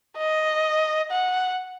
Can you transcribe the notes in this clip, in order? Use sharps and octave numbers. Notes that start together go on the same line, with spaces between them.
D#5
F#5